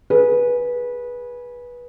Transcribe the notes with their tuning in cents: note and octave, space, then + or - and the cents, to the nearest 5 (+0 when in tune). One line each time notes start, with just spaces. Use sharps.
G#4 +0 B4 -20